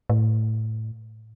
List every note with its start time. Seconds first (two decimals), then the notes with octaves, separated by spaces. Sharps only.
0.10 A2